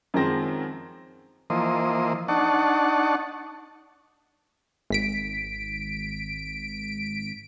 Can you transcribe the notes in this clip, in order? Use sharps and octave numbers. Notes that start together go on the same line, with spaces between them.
F#2 D#3 F3 G#3 C4 A#6
E3 F3 A#3 C5 D#5
D4 D#4 F#5 A5 C#6
G#1 B6 D7